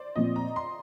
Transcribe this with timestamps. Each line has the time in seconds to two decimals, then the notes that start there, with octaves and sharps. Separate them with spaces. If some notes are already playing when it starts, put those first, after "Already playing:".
Already playing: C5 D5
0.16 A#2 F3 C4 D#5
0.36 A#5
0.56 C6